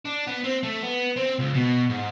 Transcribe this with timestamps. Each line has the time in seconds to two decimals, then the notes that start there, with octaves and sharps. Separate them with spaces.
0.05 D4
0.27 B3
0.44 C4
0.63 A3
0.83 B3
1.16 C4
1.39 C#2
1.54 B2
1.90 G#2